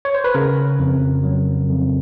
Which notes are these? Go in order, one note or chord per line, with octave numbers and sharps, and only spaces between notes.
C#5
C5
B4
C#3 A#4
F2
F#3
F2